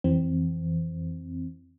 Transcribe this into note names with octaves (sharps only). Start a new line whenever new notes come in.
F2 E3 C4